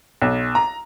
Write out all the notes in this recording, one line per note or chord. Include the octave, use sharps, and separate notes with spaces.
B1
A#5